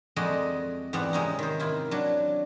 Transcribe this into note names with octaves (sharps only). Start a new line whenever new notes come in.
F2 G#3 F#4 A4 D5 D#5
E2 G#2 B3 C4 D5 F#5
C3 G#3 C#4 D#4
D#3 C5
C3 E4 F4
F#3 D4